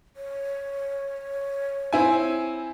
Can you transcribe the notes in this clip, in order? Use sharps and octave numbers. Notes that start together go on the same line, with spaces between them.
C#5
C4 E4 G#5